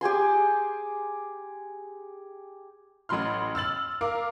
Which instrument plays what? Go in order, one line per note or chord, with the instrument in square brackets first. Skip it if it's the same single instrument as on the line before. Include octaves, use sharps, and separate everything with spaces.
[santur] G4 G#4 G#5 C6
[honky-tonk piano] A1 F#3 B5 C6 F6
E6 F6 A6 F#7
A#4 F5 D6